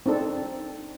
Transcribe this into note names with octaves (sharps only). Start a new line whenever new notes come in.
C4 D4 D#4 A4